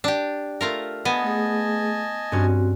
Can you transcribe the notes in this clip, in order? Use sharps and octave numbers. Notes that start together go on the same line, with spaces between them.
D4 G4
A3 F4 A#4
B3 D#5 G#5 A5 D#7
A3 G#4
G2 C4 C#4 F#4